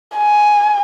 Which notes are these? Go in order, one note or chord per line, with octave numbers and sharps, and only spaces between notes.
G#5